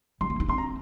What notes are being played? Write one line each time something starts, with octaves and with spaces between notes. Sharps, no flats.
G3 C6
A#3
D#4
C4 C6
A#5